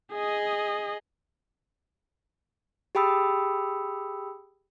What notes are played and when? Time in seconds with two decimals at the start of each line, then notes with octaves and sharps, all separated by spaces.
0.12 G#4 D#5
2.95 G4 G#4 G5 B5 D#6 E6